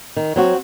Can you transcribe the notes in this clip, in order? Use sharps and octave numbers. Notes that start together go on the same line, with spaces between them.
D#3
F#3 C4 F#4